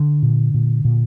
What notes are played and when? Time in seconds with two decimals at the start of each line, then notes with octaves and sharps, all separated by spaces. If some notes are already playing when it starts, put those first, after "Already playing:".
Already playing: D3
0.23 A#2
0.54 A#2
0.85 A#2